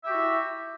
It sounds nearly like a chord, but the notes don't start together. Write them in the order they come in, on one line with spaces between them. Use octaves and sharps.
E5 G4 F#4 E4